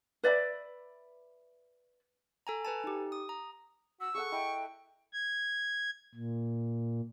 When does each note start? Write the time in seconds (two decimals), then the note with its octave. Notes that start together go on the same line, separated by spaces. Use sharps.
0.23 B4 D5 E5 B5
2.47 A4 G#5 A#5
2.65 A4 B4 G#5 A5
2.84 D#4 G4
3.12 D#6
3.29 A#5
4.01 F#4 E6
4.14 G#4 A4 F#5 C#6
4.32 E4 D#5 G5 A5
5.13 G#6
6.15 A#2